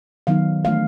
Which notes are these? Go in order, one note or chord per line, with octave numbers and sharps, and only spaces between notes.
D#3 F#3 B3 D#4 F5
E3 A3 D4 F5